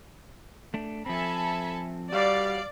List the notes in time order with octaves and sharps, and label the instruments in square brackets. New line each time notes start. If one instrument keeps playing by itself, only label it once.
[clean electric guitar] A3 D4
[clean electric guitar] F3 C4 [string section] A4 E5 G#5 [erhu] B5
[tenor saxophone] G3 [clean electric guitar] F#4 [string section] D5 [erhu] F5